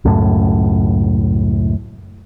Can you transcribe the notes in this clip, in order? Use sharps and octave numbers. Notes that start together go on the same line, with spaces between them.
C#2 F#2 A2